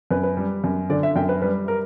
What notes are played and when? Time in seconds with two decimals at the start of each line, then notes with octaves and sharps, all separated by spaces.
0.11 F#2 B4
0.23 B4
0.37 G3
0.64 F#2
0.90 D3 D5
1.03 E5
1.16 F#2 G5
1.29 B4
1.42 G3 B4
1.68 A#4